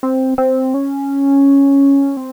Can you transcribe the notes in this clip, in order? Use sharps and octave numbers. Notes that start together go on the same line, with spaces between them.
C4
C4
C#4
C4